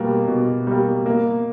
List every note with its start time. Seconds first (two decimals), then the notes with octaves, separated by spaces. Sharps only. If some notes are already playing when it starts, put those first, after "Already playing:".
Already playing: B2 G3 A#3
0.28 B2
0.67 G3 A#3
1.06 A#3